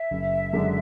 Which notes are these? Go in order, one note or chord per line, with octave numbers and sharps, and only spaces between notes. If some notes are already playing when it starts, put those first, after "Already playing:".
Already playing: E5
F#1
F#2 D3 G#3 D4